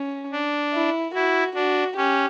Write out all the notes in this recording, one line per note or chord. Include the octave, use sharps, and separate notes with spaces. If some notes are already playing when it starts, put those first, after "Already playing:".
Already playing: C#4
D4
E4
E4 F#4
D4 F#4
C#4 G4